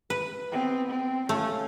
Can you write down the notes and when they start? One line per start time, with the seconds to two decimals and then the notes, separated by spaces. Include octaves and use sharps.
0.10 B4
0.51 B3 C4
0.89 C4
1.29 A3 C#4 F4